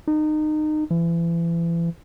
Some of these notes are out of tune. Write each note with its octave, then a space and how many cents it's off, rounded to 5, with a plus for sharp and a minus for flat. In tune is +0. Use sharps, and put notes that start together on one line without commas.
D#4 -25
E3 +35